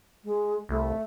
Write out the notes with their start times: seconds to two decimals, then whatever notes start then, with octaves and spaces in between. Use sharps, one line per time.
0.24 G#3
0.69 C2 A3